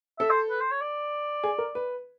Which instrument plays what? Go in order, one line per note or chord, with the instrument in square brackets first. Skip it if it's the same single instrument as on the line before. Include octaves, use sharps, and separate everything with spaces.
[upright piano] A4 [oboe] E5
[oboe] C5
B4
C5
C#5
D5
[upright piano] G#4
A#4
B4